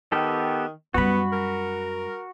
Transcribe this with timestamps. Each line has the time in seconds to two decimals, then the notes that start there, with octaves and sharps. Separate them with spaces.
0.12 D#3 B3 G4 A4
0.94 F#2 G3 B3 F#4 B5
1.33 A#4